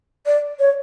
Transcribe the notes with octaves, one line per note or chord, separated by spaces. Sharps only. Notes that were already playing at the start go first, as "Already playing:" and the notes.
D5
C#5